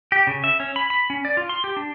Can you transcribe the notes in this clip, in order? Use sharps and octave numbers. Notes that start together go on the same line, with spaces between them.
G4
C#3
E5
C#4
B5
B5
C#4
D5
F4
C6
G4
D4